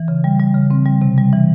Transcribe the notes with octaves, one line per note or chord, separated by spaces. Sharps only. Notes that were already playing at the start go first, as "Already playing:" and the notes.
Already playing: E3
C#3
G3
G3
C#3
C4
G3
C3
G3
E3